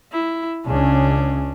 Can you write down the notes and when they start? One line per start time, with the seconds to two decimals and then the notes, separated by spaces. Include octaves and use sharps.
0.12 E4
0.66 C#2 C#3 C#4 D4